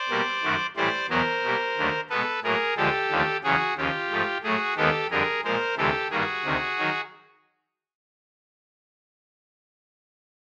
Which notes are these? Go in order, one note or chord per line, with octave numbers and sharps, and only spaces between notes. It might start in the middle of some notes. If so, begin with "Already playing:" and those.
Already playing: C5 D5
B2 G3 A#3
F#2 D#3 F#3 A3
A2 E3 G3 C5 D5
E2 B2 F#3 B3 A#4 C5
B2 G3 A#3
D#2 D3 F#3 A3
B2 G#3 B3 A4 B4
A2 F#3 A#3 G#4 A#4
D2 D3 F3 G#3 G4 A4
D#2 D3 F3 A3
E2 C#3 F#3 F#4 G#4
D#2 C#3 F3 F4 G4
G#2 F3 A3
A2 F#3 A3 F#4 G#4
D#2 D#3 G#3 B3 G4 A4
F2 D3 G3 G#4 A#4
A#2 F3 G#3 A#4 C5
D2 C3 E3 G#3 G4 A4
G2 D#3 G3 A#3 F#4 G#4
D2 C3 D#3
D#3 F#3